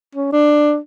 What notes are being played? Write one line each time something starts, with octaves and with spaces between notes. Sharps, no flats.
C#4
D4